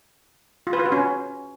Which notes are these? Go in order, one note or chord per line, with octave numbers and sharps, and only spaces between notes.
F4
B4
F4
F#4
C#4